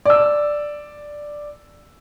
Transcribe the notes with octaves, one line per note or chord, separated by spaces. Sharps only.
D5 E6